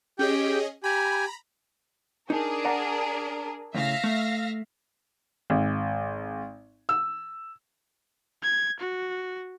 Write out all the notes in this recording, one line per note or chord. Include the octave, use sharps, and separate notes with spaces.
C#4 G4 G#4 D#5 G5
G4 G#5 A#5 B5
D4 D#4 G#4 A#4
D5 F#5 A#5
E2 A2 C#3 E5 F5 A#6
A3
G#1
E6
G#6
F#4